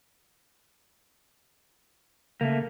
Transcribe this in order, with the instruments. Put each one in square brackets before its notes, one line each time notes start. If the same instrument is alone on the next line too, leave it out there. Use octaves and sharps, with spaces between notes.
[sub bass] C#3 [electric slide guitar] A3 A#3